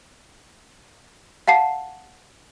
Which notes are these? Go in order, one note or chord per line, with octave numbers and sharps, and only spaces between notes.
F5 F#5 A5 C7